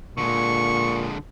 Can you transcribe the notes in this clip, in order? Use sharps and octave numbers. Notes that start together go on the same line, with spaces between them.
A#2 D3 G#3 C#6